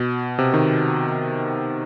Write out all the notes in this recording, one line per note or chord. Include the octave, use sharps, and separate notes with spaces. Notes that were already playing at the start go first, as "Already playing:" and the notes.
Already playing: B2
C3
D#3